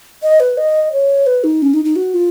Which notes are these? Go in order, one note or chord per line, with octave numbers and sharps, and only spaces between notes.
D#5
B4
D#5
C#5
B4
D#4
C#4
D#4
D#4
F#4
F4